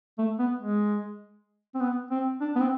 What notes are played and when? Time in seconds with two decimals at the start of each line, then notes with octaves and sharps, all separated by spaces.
0.18 A3
0.39 B3
0.59 G#3
1.74 C4
1.80 B3
2.11 C4
2.40 D4
2.55 B3
2.60 C4